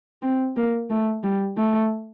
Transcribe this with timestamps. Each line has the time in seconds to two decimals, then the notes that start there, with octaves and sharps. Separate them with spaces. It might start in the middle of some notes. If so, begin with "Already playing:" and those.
0.22 C4
0.56 A#3
0.90 A3
1.23 G3
1.57 A3